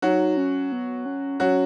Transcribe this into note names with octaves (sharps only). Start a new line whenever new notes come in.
F#3 D#4 F#4
C#4
B3
C#4
F#3 C#4 F#4